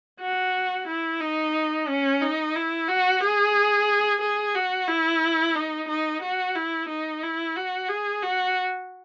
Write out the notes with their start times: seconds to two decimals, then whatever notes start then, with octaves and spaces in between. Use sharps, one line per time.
0.20 F#4
0.88 E4
1.20 D#4
1.88 C#4
2.21 D#4
2.55 E4
2.88 F#4
3.21 G#4
4.22 G#4
4.55 F#4
4.88 E4
5.56 D#4
5.88 D#4
6.22 F#4
6.55 E4
6.89 D#4
7.23 E4
7.56 F#4
7.88 G#4
8.22 F#4